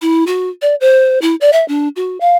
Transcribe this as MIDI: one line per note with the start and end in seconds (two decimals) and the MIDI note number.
0.02 0.24 64
0.27 0.49 66
0.62 0.75 74
0.81 1.19 72
1.22 1.35 64
1.41 1.50 74
1.53 1.67 76
1.68 1.88 62
1.96 2.18 66
2.20 2.37 77